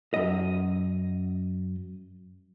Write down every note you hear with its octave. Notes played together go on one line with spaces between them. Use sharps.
F#2 D#5